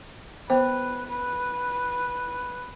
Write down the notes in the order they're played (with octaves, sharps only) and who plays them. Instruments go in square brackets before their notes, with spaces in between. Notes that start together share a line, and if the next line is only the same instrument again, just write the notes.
[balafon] B3 C5 [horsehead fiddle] B4
[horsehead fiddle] B4